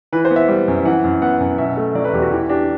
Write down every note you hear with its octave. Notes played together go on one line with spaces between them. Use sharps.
E3 B4
C5
B3
E5
G3
F#2
E3 F#5
F#2
B3 F#5
F#2
B2 E5
A3
F#3 D5
B4
E2 G4
F#4
E3 G4
D4 G4